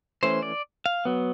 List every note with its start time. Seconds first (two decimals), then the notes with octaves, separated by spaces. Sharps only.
0.23 E3 A3 C#4 C5
0.43 D5
0.86 F5
1.05 F#3 B3